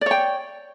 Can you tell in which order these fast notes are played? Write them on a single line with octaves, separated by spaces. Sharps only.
D5 C#5 G5